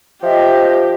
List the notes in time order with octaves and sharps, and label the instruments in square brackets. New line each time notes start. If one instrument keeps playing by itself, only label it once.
[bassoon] F3 [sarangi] G4 [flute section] D#5 E5